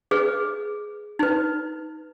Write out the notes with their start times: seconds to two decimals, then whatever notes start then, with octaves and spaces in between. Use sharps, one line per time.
0.11 G#4 B4
1.19 D#4 B4